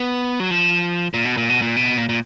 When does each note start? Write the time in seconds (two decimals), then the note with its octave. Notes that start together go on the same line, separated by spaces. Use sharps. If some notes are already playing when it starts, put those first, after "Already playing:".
Already playing: B3
0.40 F#3
0.51 F3
1.14 A#2
1.25 B2
1.37 A#2
1.50 B2
1.62 A#2
1.76 B2
1.98 A#2
2.09 A#2